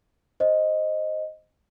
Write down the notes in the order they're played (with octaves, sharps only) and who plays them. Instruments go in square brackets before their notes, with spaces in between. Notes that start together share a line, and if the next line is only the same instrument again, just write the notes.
[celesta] C5 D#5